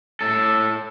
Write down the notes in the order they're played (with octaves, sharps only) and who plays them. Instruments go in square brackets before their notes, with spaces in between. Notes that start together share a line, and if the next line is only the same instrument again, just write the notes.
[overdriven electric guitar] A2 A4